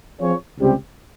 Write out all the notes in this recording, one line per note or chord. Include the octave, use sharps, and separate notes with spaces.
F3 C4 F4 G#4 C#5
C#2 C3 G3 C4 G4